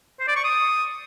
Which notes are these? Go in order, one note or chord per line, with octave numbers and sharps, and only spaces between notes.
C5
D5
C#6
D#6